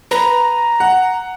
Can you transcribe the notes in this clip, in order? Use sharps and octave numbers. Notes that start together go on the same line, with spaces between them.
B4 A#5
F#5